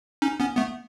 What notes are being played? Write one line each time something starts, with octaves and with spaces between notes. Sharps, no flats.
C#4 D#4
B3 C#4
A3 B3